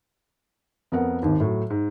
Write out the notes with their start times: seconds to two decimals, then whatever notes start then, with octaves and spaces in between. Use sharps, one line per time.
0.92 F2 B3 A#4 F#5
1.23 G#1 D#2
1.40 A2 F#3
1.70 G#2